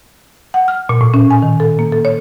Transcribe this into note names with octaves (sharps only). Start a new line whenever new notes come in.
F#5
F6
A#2
A2
C#4
G#5
D#3
A4
A#3
A4
C#5